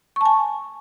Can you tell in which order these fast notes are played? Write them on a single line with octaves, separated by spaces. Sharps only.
C#6 A5 G#5